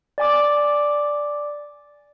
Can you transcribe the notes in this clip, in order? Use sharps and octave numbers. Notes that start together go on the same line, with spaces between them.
D5 G#5 D6